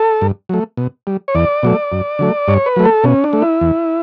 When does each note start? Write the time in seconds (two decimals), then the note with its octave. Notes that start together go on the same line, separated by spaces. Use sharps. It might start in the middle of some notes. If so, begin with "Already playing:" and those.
Already playing: A4
0.22 G2
0.49 F#3 A3
0.77 B2
1.07 G3
1.28 C#5
1.35 E2 D5
1.63 B2 F#3 A3
1.92 F#2
2.19 D3 F#3 A3
2.48 G2 C#5
2.66 B4
2.76 F#3 A3
2.85 A4
3.04 B2 C#4
3.24 D4
3.33 A3
3.42 E4
3.61 E2